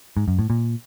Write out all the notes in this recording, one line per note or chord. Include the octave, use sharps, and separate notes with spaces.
G#2
F#2
A2
A#2